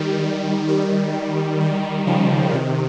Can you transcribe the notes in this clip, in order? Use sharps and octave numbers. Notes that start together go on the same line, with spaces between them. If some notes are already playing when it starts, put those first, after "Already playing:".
Already playing: D#3 G3
D#3 G3
D#3 G3
C#3 F3
C3 D#3